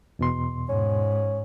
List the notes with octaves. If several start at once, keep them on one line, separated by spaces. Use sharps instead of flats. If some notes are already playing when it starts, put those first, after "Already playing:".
E2 B2 C6
G#2 C#4